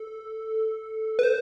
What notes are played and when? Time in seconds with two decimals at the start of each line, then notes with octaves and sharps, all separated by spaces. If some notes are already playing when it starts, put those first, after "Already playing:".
Already playing: A4
1.19 B4
1.23 C5